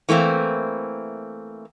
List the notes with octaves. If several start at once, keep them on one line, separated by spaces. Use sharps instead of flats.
E3 A3 A#3 C4